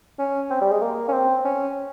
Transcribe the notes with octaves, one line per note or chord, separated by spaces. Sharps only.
C#4
C4
G3
G#3
A#3
C#4
C4
C#4